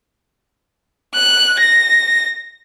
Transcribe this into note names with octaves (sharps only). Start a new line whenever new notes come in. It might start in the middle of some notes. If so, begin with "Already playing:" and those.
F#6
A#6